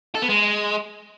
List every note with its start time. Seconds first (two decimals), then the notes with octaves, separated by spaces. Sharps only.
0.15 A4
0.22 B3
0.29 G#3